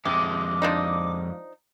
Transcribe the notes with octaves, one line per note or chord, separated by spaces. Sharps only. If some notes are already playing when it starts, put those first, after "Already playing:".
F2 C3 G#3 D6
F3 D4 D#4